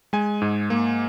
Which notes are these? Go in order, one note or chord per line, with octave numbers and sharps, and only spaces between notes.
G#3 G#5
G#2
A#3